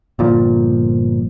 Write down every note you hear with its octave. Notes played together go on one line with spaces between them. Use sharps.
G1 A#2 F3